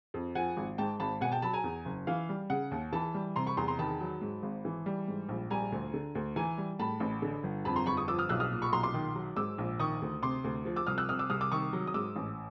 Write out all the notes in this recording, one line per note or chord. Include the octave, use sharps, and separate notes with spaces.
F2
F3 F#5 G#5
G#1
G#2 G5 A5
G#1 A5 B5
B2 F#5 G#5
G5 A5
F#3 A5 B5
G#5 A#5
E2
F#1
E3 F5
G3
C#3 F#5
D#2
E3 A5 B5
G3
C3 A#5 C6
B5 C#6
E2 A#5 C6
A#5 C6
D#3 A5 B5
F#3
G#2
G#1
E3
G3
G#2
A#1
G3 G#5 A#5
D2
D3
D2
E3 G#5 A#5
G3
A2 A5 B5
A1
D3
G1
F2 A5 B5
A#5 C6
G1 B5 C#6
C#6 D#6
F3 D6 E6
D#6 F6
B1 E6 F#6
D#6 F6
A#2
B5 C#6
B1 A#5 C6
C6 D6
D#3
F#3
G#2 D6 E6
A#1
D#3 C#6 D#6
D2
C3 C6 D6
D2
F3
D6 E6
C2 D#6 F6
E6 F#6
C3 D#6 F6
D6 E6
C2 D#6 F6
D6 E6
D#3 C#6 D#6
F#3
D#6
G#2 D6 E6
A1